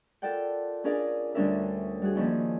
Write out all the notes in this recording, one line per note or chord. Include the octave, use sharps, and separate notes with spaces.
F4 A4 A#4 D5 F#5 G5
C#4 D4 G#4 A#4 D5 F5
D2 G3 C#4 D4 A#4 E5
G3 F#4 G#4
D#3 F3 A#3 C#4 D4 E4